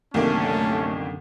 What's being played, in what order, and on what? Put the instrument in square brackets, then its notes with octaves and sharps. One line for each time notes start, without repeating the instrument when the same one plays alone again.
[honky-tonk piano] C2 D#3 A#3 [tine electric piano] F#2 D3 [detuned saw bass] A3 [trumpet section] C#4 A5